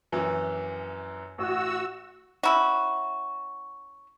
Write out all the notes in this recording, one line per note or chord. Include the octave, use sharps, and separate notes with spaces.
A#1 F#2 E3
A1 F#4 E6
C#4 E4 F#4